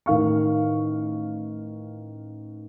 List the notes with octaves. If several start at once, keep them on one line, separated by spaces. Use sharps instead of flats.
A1 D#3 F5 C#6